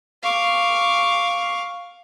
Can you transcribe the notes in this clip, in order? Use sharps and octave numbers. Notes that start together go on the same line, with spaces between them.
F5 C#6 D6